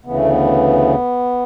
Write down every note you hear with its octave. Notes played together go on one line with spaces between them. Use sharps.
D2 C#3 E3 B3
A3
B3